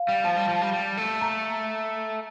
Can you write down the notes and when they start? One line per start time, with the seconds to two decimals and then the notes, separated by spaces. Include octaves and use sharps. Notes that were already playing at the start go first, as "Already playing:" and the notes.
Already playing: F5
0.09 G3
0.24 F3 A5
0.37 G3
0.49 F3
0.62 G3
0.73 G3
0.97 A3
1.21 A#5